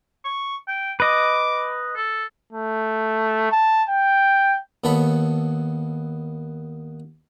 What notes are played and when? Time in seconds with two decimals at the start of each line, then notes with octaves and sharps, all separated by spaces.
0.25 C#6
0.68 G5
1.00 B4 D#5 D6
1.96 A4
2.53 A3
3.52 A5
3.89 G5
4.84 D#2 B3 A4 C#5 B5